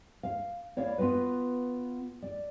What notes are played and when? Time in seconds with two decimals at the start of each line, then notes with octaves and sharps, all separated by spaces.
0.23 F5
0.77 E4 C#5 D5 F5
0.98 B3 F4 F#4 B4
2.22 D5